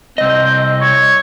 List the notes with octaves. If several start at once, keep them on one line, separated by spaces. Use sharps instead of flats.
C2 C4 D#5
C#5